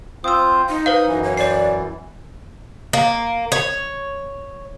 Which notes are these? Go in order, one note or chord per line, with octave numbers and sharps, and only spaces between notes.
C4 F4 C5 D#6 E6
D#4
B4 C5 F5 D#6
F#2 E3
C#5
C#5 D5 C7
A#3
C#5